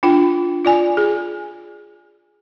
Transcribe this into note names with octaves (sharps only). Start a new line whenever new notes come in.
D4 F4 G5
F4 D5 G#5
G#4